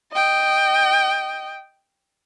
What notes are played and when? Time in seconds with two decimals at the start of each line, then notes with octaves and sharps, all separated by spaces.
0.13 D#5 G5